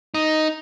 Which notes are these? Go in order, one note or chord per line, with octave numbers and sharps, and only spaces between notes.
D#4